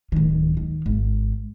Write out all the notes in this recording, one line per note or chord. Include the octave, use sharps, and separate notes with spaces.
D1 D#3
D#3
G#1